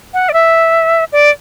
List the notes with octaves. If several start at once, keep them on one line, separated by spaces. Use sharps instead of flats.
F#5
D5
E5
D5